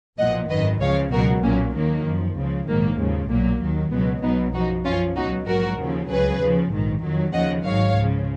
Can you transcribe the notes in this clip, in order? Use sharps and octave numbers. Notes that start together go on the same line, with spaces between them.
B1 A#2 F3 D#5 F#5
G#1 F#2 D#3 B4 D#5
C#2 C#3 F3 C#5 F5
C#2 B2 F#3 F#4 A#4
B1 A#2 F#3 A#3 C#4
D#2 D#3 F#3 A#3
F#2 F3
C#2 C#3 F3
A#1 G#2 D#3 F#3 A#3
D#2 C#3 F3
B1 A#2 F#3 A#3
D#2 D#3 F#3
C#2 B2 F#3 G#3 B3
B1 B2 F#3 B3 D#4
F#2 F3 D#4 F#4
F#2 C#4 F4
F3
C#2 B2 F#3 D#4 F#4
A#1 G#2 F#3 F#4 A#4
D#2 C#3 F3
C#2 C#3 F#3 G#4 B4
D#2 C#3 F3
A#1 G#2 D#3
F2 D#3 F#3
D#2 C#3 F3 D#5 F#5
G#1 G#2 D#3 F#3 C#5 F5
C#2 C#3 F3